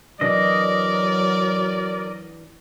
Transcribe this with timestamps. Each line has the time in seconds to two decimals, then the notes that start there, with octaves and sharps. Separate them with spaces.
0.21 E3 F#3 D4 A#4 D5 D#5